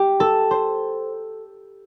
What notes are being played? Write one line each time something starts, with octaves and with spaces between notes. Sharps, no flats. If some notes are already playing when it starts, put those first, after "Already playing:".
Already playing: G4
A4
C5